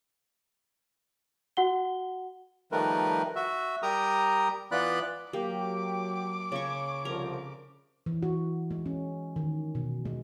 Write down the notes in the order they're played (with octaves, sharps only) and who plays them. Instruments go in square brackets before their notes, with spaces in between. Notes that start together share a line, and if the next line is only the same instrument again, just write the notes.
[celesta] F#4 F#5 G7
[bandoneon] D#3 F3 G3 A3 A#4 B4
F#4 E5
G3 G4 A#4 A#5 D#6
E3 B3 F4 D5 B5 F#6
[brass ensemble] F#3 [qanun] A#3 [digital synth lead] G4 [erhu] D6
[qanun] C#3 C#6 [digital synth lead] C#5
[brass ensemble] C2 D3 F3 [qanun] A#4
[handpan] E3
F#4
G#3
C#4
D#3
B2
G#3